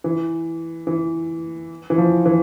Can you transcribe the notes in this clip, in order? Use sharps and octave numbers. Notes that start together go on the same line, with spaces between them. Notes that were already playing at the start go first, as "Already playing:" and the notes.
E3
E3
E3
F3
E3